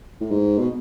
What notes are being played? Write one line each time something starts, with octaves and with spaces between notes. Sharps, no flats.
A2
G#2
B2